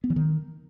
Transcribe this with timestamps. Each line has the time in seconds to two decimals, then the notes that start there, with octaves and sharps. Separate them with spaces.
0.04 B3
0.10 E3
0.16 D#3